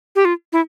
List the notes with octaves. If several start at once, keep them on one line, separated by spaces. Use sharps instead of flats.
G4
F4
E4